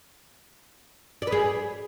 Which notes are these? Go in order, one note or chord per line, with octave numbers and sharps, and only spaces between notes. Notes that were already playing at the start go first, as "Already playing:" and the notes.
D5
B4
G#4